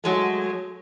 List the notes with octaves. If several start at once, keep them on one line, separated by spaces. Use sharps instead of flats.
F#3 G#3 A3